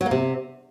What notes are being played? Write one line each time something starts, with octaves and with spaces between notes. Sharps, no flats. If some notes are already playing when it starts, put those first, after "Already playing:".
F#3
A#3
C3